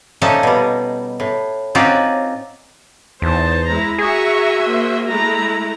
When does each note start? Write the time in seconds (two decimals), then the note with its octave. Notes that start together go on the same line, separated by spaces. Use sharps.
0.21 A#2 F3 A3 C#4 D#4 A5
0.43 B2 G3
1.20 A2
1.75 C4 C#4 D#4 F4 F#4 D5
3.22 E2 D#4 C5 A5
3.67 G#3 E4 A#5
3.98 F#4 G#4 E5 G#5 A#5 C#6
4.63 A#3 C5
5.07 G#3 A3 E4 A#5